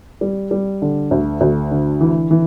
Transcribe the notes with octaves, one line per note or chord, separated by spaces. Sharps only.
G3
G3
D3
D2
D2
D3
E3
E3